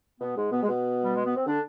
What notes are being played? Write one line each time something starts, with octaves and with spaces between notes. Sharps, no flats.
B2 B3
G#2 G#3
B2 B3
G#3
B2 B3
G3
G#3
B3
C4
D3 D4